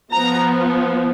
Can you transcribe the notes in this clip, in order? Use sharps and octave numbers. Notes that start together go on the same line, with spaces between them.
F3 B3 A#5